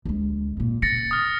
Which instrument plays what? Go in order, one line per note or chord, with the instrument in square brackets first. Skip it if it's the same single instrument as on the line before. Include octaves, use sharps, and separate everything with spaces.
[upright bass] D2 G#3
G#1 A#2
[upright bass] C#3 [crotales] A6 A#6 C#7
[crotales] D#6 F6